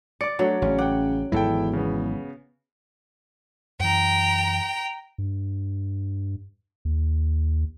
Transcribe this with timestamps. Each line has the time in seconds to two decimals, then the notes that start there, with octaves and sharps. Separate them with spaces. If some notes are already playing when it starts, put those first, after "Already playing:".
0.21 D5 D6 C#7
0.39 F#3 A3 D4
0.62 A1 C#3 C#4
0.79 F#5 G5 D6
1.32 G#1 E2 G#2 F#3 E4 A4 G5
1.73 C#3 B3
3.80 F#2 E3 G5 A#5
5.18 G2
6.85 D#2